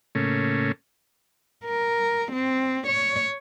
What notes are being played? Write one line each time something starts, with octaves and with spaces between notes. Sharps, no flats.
A2 C#3 A3 A#3 C#4
A#4
C4
C#5